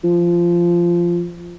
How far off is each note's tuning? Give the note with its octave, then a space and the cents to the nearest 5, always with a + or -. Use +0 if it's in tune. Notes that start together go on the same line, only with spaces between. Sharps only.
F3 -15